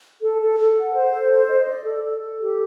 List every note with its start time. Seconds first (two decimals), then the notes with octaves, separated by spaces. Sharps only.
0.21 A4
0.40 A4
0.58 A4
0.76 F#5
0.94 C5
1.12 A4
1.31 C5
1.49 D#5
1.68 D5
1.85 A4
2.03 A4
2.21 A4
2.40 G4